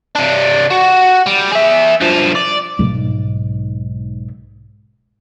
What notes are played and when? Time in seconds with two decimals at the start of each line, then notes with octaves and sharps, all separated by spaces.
0.15 C3 D4
0.71 F#4
1.26 G3
1.52 G#4 E5
2.01 G2 F3
2.35 D5
2.79 B1 G#2